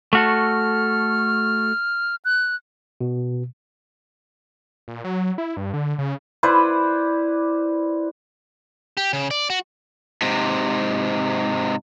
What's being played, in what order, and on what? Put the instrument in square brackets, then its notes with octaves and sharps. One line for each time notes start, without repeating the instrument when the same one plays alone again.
[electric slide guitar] A3 F#4 A4 [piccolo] F6
[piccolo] F#6
[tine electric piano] B2
[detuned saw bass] A#2
F#3
E4
G2
D3
C#3
[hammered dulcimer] E4 B4 C5 D5
[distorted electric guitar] G4
C#3
D5
F#4
[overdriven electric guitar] G#2 C3